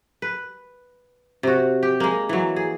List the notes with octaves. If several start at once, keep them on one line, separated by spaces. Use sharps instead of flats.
B4
C3 F#4
G4
G#3 A#3
E3 F#3
G#4